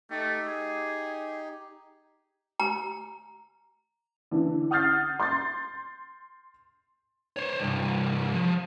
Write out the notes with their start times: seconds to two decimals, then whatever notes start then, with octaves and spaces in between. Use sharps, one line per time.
0.10 A3 D#4 G4
0.48 G#4
2.60 A#5
4.31 D3 E3
4.71 F#5 D#6 F6 G6 A6 C7
5.20 C6 G6 A6
7.36 C5 C#5
7.59 C2 G2
8.33 F3